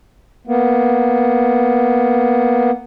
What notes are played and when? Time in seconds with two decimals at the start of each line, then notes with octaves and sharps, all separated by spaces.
0.47 A#3 B3